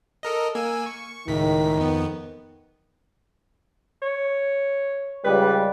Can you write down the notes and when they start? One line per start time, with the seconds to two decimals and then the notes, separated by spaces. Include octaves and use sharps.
0.23 A4 A#4 D#5
0.55 A#3 G#5 E6
0.86 C#6
1.28 C#2 A2 D#3 B6
1.77 F2 B3
4.02 C#5
5.24 C#2 G3 B4